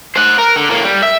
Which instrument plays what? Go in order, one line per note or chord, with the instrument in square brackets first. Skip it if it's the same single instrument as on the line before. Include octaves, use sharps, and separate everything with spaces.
[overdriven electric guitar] C5 F#5
A#4
D3
A2 A#3
G3
E5